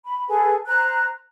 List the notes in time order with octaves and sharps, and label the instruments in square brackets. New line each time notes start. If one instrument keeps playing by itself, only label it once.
[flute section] B5
G#4 A4 B4 G#5
C5 A#5 F#6